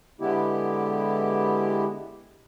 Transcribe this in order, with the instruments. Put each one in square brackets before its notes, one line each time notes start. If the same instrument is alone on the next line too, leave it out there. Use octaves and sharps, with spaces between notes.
[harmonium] D3 G#3 B3 E4 G4